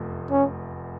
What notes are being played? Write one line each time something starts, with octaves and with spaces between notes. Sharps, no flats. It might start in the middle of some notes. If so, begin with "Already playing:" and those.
Already playing: F1 E2 C3 F3 A3
C#4